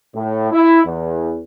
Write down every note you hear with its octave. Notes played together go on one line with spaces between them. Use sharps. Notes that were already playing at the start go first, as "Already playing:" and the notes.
A2
E4
E2